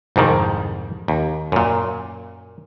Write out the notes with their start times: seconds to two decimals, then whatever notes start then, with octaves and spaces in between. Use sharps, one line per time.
0.16 C2 F2 G#2 D#3
1.08 D#2
1.52 F#2 A#2